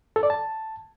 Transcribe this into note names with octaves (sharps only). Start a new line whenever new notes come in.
A4
D5
A5